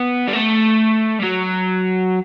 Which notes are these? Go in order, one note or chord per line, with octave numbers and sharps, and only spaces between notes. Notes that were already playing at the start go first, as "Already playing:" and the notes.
Already playing: B3
G3
A3
G3
F#3